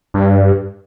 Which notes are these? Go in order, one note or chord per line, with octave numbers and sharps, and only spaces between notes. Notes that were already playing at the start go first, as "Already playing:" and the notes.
G2